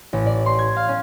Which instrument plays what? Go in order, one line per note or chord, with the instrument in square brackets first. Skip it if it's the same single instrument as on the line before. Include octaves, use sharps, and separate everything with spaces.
[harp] A1
D5
C6
G#6
F5
C#4